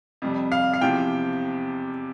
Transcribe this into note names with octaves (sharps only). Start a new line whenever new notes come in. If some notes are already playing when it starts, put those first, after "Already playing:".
F2 C3 G3
F5
F5
E2 C3 F3 G5